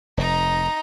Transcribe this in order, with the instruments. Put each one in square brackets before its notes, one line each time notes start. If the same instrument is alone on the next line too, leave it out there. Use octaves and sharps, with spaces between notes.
[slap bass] F1 [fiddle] D#4 A#5